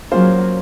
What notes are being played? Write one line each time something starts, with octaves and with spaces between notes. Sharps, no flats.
F#3 A#3 C#4 F4 G#4 C5